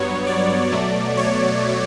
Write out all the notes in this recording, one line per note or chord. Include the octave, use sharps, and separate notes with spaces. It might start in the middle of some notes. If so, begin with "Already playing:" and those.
Already playing: G2 F#3 B3 C#5
D5
B2 F#3 A3
C#5